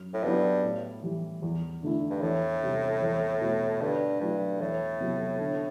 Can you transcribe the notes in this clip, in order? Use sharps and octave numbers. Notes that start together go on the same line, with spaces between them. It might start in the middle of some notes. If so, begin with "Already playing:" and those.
Already playing: F#2
A2
G2 F#3 B3 E4
A2
E3 G3
E2
D3 A3 E4
G2
E2 A2
C3 G3
E2
B2 A3 E4
G2 D3
G2 F#3 A3 E4
E2 A2
C3 F#3 B3 E4
D3